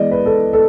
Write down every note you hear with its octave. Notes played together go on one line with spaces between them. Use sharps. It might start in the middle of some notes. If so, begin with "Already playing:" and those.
Already playing: E3 G#3 B3 D5 D#5
B4
A4
A4